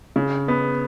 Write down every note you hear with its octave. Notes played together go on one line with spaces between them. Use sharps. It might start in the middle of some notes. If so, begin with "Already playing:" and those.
C#3
B3